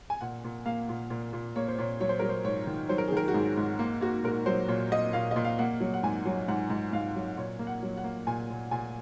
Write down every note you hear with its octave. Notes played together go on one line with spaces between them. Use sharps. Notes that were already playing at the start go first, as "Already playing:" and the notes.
G#5
A#2 F#5
A#2
A#3 F5
A#2
A#2
A#2
A#3 C#5
C5
A#2 C#5
F#3 C#5
C5
F#3 A#4
C5
G#2 C#5
D#3
F#3 C5
A#4
G#4
D#3 A#4
F#4
G#2 G#4
G#2
A#3
A#3 F#4
A#2 A#4
F#3 C5
A#2 C#5
A#3 D#5
A#2 F5
A#2 D#5
F5
A#3 F#5
F#3
F#5
G#2 G#5
F#3
G#2 F#5
G#2
G#2 F5
F#3
A#2 C#5
A#3
F#5
F#3
F#5
A#3
A#2 G#5
A#2
A#2 G#5